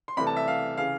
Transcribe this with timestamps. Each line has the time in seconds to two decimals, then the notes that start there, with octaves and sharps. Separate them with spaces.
0.08 C6
0.17 C2 C3 E3 A3 B5
0.27 A5
0.37 E5
0.48 F5
0.77 C#3 E3 F5